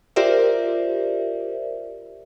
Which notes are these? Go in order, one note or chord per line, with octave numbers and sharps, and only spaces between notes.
F4 G4 A#4 C5 D5 E5